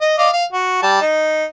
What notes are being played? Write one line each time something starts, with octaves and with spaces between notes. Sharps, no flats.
D#5
D5 D#5 F5
F5
F#4
G3 A5
D#4